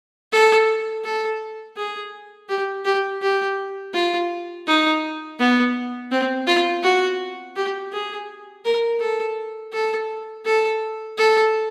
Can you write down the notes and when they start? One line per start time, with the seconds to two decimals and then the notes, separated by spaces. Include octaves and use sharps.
0.32 A4
1.04 A4
1.77 G#4
2.49 G4
2.85 G4
3.22 G4
3.94 F4
4.67 D#4
5.39 B3
6.11 C4
6.47 F4
6.83 F#4
7.56 G4
7.93 G#4
8.65 A#4
9.00 A4
9.73 A4
10.45 A4
11.18 A4